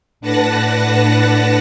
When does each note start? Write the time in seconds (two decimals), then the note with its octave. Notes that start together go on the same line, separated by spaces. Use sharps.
0.21 A2 D4 B4 F#5 A5 A#6